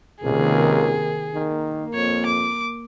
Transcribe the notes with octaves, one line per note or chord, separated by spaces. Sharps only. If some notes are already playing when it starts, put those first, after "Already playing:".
C#2 C3 D#3 A#3 G#4
D#3 A#3
F2 C#5
D6